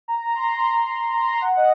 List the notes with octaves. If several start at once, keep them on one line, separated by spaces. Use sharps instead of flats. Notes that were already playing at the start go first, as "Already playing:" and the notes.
A#5
C6
A#5
C6
A#5
C6
F#5
D#5